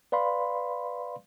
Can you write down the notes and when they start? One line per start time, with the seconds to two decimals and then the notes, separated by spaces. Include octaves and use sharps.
0.12 B4 D5 F5 B5 C6